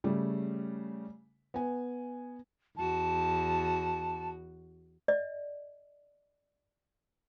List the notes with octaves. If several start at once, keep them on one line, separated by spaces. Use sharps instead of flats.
C#3 G3 A3
B3 G#5
E2 F#4 A5
D5 D#5